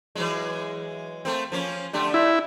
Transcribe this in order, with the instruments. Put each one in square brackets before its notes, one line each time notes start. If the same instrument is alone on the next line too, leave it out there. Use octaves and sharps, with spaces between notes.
[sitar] E3 F#3 G#3
A3 A#3 C4
F3 A#3 C#4
D3 A3 G4
[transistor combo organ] E4